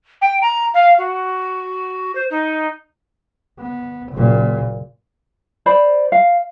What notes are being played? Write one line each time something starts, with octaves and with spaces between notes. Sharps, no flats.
G5
A#5
F5
F#4
C5
D#4
B3
F#1 A#2
C5 D5 B5
F5